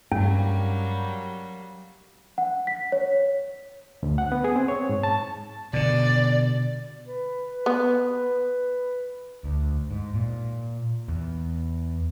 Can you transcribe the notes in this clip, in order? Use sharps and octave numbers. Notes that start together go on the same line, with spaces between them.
G2 F#3 G3 A#3 C#4
F#5
B6
C#5
D2
F#5
B3
G#4
C4
C#5
G#2
A5
B2 D3 D5
B4
B3
D2
G#2
A#2
E2